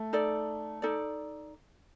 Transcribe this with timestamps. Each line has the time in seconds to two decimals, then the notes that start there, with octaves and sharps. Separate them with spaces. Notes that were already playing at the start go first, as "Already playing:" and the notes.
Already playing: A3
0.13 D#4 A4 D5
0.82 D#4 A4 D5